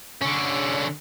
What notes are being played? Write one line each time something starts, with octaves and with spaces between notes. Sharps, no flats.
D3 C#4